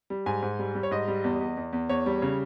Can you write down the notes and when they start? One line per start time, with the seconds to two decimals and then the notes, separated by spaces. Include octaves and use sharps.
0.10 G3
0.26 G#2 G#5
0.43 G#2
0.59 G3
0.75 G3
0.83 C#5
0.91 G#2 D#5
1.08 G3
1.24 E2
1.41 E2
1.57 E2
1.73 E2
1.89 E2 C#5
2.06 G3
2.22 C#3